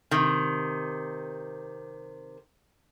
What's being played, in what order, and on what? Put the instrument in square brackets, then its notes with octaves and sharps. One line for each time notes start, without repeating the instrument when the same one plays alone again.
[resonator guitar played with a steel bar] C3 D#3